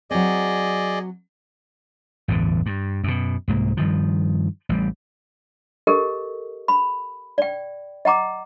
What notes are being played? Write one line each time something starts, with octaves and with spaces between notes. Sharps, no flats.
F#3 C4 G#4 D5 D#5
A1 E2 G2 D3
G2
F#2 B2
C2 G#2 A#3
G2 D#3 F3
A1 G3
G4 A4 A#4 D#5
B5
D5 G5
D#5 F#5 A#5 D6